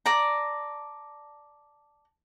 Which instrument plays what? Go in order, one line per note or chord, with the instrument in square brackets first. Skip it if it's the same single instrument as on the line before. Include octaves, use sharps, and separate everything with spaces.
[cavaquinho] D5 A5 A#5